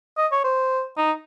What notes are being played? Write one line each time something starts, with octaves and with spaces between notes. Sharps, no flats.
D#5
C#5
C5
D#4